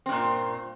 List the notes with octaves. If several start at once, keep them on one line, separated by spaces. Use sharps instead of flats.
G2 A#2 C4